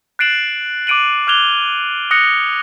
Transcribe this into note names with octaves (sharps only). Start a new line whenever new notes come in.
F#6 A6 C7 D7 E7 F#7
D6 F#6 D7 D#7 F#7
D6 F6 F#6 G#6 F7 G7
D#6 F#6 A#6 C#7